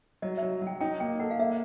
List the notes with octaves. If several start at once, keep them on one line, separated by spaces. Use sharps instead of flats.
F#3 D#5
E5
F#3
F#3
G5
D#4 G5
A#3 G5
A4 F#5
F5
A#3 E5